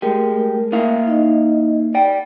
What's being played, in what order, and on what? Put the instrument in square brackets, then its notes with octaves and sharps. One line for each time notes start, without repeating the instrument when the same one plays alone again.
[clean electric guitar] G#3 G4 [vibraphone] A3 A#4
[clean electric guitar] A#3 E4 F5
[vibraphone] D#4 D#5
[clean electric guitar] D5 G5